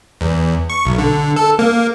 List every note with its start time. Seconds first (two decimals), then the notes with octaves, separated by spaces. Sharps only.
0.21 E2
0.70 C#6
0.85 B1
0.98 D3
1.36 A4
1.59 A#3